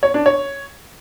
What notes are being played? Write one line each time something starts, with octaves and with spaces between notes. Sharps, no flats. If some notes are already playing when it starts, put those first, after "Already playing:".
C#5
D4
C#5